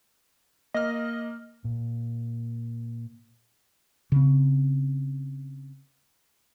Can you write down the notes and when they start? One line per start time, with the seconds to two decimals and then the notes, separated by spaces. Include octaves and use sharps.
0.74 A#3 D#5 F6
1.64 A#2
4.12 C#3 C4